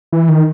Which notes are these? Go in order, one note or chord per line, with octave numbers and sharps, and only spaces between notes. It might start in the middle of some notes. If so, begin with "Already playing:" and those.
E3
D#3